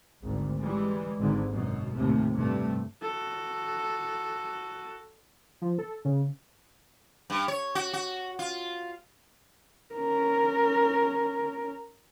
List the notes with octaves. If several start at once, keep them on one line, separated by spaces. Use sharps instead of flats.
G#1 D2
E3 G3 G#3
G#1 G#2 D3
F#2 B2
D#2 A2 C3 A3
G2 C3 A3
F#4 A4
F3
A4
C#3
G2
C#5
F#4
F#4
F4
C#4 A#4